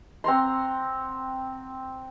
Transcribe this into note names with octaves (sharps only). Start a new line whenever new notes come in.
C4 F#5 A#5 C6